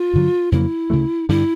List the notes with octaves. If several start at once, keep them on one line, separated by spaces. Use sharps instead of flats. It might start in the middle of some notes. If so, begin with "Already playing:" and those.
Already playing: F4
G2 D3 F#3
F2 C#3 F#3 A#3 E4
D2 C#3 F#3 A3
G2 D3 G3 E4